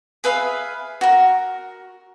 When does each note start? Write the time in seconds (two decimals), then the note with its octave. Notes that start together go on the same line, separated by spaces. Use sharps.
0.24 G#4 B4 E5 F5
1.01 F#4 A#4